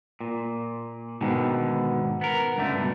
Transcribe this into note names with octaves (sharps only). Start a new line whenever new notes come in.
A#2
G#2 B2 D3 D#3
B3 A#4
C#2 G2 D3 A3
B2